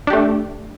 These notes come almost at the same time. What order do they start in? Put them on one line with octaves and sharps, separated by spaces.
D4 G4 A3